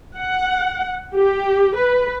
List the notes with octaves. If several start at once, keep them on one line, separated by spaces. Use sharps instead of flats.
F#5
G4
B4